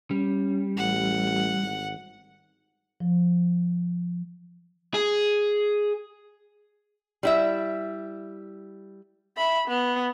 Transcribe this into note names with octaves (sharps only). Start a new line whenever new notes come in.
G3 C#4
A1 F#5
G#1
F3
G#4
G3 E4 E5
E5 B5
B3